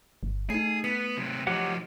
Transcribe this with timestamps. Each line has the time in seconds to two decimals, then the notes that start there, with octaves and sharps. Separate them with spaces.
0.23 G1
0.50 A3 D#4 G#4 C7
0.84 B3 B6
1.18 C3 F#3
1.47 F3 F#3 D#4 G4 F#5